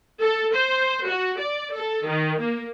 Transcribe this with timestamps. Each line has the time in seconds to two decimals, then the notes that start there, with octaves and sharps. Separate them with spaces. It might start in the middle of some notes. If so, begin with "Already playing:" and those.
0.21 A4
0.53 C5
1.05 F#4
1.38 D5
1.72 A4
2.05 D#3
2.38 A#3